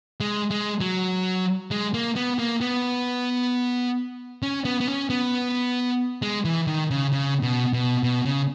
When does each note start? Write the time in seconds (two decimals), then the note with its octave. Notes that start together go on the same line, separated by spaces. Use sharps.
0.20 G#3
0.51 G#3
0.81 F#3
1.71 G#3
1.94 A#3
2.16 B3
2.39 A#3
2.61 B3
4.43 C#4
4.65 B3
4.80 B3
4.88 C#4
5.10 B3
6.22 G#3
6.45 E3
6.67 D#3
6.91 C#3
7.12 C#3
7.42 B2
7.73 B2
8.03 B2
8.25 C#3